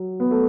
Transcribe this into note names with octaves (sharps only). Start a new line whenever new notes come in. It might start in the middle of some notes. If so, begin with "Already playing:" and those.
Already playing: F#3
B3
A3